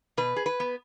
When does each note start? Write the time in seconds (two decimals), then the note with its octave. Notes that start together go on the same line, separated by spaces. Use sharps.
0.17 B2 B4
0.36 G#4
0.46 B4
0.60 B3